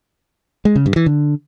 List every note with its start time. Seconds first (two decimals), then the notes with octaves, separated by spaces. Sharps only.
0.65 G#3
0.76 C#3
0.86 G2
0.96 E3
1.06 D3